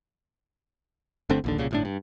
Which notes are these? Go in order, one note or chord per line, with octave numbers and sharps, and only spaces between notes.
G1 D3 A3 C4
A#1 D#2 D3
C2 A#2 C#3
G1 A2 D4
G2